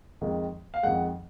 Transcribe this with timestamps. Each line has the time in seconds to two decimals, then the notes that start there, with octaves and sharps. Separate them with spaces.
0.21 F2 D#3 G#3
0.74 F5
0.83 F2 D#3 G#3 F#5